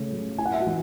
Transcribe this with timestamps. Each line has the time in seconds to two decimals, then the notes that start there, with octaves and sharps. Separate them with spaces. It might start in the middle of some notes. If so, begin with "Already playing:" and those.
Already playing: C#3 A3
0.12 F#3
0.38 E4 G#5
0.46 F#5
0.53 E5
0.60 F#4 F#5
0.66 E3